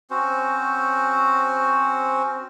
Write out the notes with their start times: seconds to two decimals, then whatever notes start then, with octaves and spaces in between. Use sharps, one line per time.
0.10 C4 C#4 F#4 C5